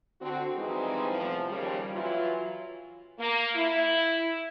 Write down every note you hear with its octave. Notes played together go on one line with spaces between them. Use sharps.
D3 C4 F#4
E3 F3 G3 G#3 C4 D#4
E2 A2 C3 F3
D#2 C#3 F3 G3
E3 F#3 E4 F4
A#3
E4